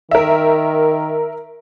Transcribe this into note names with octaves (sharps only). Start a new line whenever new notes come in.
D#3 A#4 E5